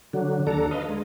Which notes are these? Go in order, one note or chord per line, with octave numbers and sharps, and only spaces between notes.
D3 F#3
D#2 D4 A4 A#5
B4 D#5 F5
G#3